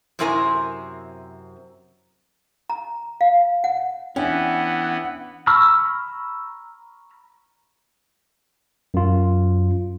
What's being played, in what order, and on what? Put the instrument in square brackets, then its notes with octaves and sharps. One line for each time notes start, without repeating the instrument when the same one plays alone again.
[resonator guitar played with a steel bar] F#2 C3 C4 E4 A#4 G#5
[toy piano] A#5
F5
F#5
[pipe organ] E3 B3 [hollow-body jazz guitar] C#4 [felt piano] D4 E5 G5 [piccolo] F#5
[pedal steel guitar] A#5 B5 C#6 E6 F6
[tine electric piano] F#2 F4